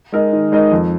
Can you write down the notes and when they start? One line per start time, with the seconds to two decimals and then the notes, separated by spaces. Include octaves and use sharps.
0.12 G#3 D#4 A#4 D#5
0.33 D#3
0.52 G#3 D#4 A#4 D#5
0.72 F2